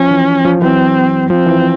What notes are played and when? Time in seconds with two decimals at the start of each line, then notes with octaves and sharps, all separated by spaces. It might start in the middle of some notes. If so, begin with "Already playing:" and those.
Already playing: F3 C#4
0.11 E3
0.45 F3
0.62 E3 F#3 C4
1.30 F3 C4
1.47 E3